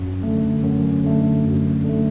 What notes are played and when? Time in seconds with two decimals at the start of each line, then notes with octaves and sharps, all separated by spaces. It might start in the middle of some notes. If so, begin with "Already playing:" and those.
Already playing: F#2
0.23 D3 A3
0.63 F#2
1.04 D3 A3
1.45 F#2
1.84 D3 A3